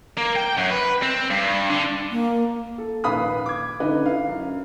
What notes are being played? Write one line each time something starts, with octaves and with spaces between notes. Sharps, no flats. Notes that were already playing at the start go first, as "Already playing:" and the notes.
A#3
G5
F#2
B4
C4
G2
D3
A#3
A4
A#1 D#2 B4 F5 B5 D#6
D6 G#6
D3 C#4 D#4 B4
E4 F5
F#2